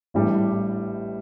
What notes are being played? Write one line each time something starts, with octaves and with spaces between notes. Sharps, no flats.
A1 A2 G3 D4 G4